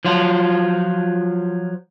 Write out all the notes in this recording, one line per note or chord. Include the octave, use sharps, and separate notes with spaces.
F3 F#3 F4